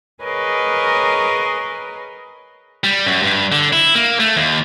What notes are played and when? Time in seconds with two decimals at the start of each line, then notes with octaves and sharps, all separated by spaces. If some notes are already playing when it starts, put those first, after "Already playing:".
0.23 G#4 A#4 B4 C#5 D#5
2.84 G3
3.06 F#2
3.23 G2
3.52 D3
3.73 E4
3.95 A#3
4.20 A3
4.36 D#2